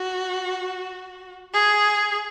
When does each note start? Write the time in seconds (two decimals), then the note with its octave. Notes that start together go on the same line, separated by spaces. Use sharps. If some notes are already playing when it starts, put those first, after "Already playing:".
Already playing: F#4
1.54 G#4